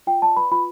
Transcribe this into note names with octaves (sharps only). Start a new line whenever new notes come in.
F4 G5
D5 A5
B4 B5
F4 B5